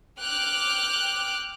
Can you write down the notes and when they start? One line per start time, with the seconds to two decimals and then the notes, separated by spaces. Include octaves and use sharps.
0.20 G5 D6 F6 F#6